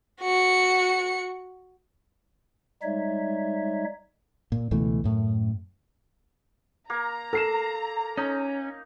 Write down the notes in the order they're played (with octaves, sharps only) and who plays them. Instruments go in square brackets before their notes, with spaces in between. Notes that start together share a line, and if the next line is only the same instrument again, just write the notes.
[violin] F#4 C#7
[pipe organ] G3 G#3 D#4 C#5 E5
[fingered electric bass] A#2
C#2 B2 E3 A3
F#2 A2
[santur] A#3 [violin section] A#5
[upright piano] A4 C7 E7 [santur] A#4
[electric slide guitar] C#4 [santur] D#4